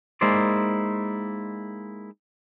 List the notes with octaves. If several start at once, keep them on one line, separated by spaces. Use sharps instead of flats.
G#3 A#3 D#4 E4 C5 D5